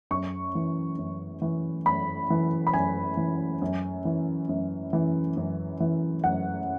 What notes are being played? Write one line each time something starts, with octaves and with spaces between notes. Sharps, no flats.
F#2 C#6
E3
F#2
E3
F#2 B5
E3
B5
F#2 G#5
E3
F#2
E3
F#2
E3
F#2
E3
F#2 F#5